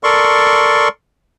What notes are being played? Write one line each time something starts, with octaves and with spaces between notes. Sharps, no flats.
A4 A#4 D5 C6 C#6